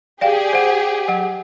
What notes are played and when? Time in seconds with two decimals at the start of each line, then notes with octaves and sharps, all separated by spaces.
0.21 G4 G#4 D5 F5 G5
0.53 C5 F#5
1.08 F#3 F#5